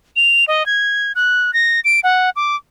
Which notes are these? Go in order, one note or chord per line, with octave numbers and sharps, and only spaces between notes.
F7
D#5
G#6
F#6
A#6
D7
F#5
D6